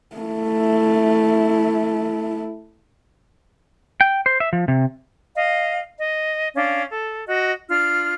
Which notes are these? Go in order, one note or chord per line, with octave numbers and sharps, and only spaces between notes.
A3 E4
G5
C5
E5
F3
C3
D#5 F5
D#5
C#4 D4 F5
A4
F#4 D#5
D4 F4 F6